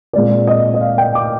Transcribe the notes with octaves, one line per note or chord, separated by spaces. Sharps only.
A#2 G#3 C4 D5
D#5
D#5
F5
G5
D6